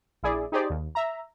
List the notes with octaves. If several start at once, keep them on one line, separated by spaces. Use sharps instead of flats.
A#1 E4 G#4 D5
D#4 G4 G#4 C5 D5
D#2
E5 A#5